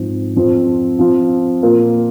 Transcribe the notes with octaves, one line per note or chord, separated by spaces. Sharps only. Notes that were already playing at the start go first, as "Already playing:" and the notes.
Already playing: G#2 F3 C4
F2 F3 C4
F3 C4 F4
A#2 A#3 F4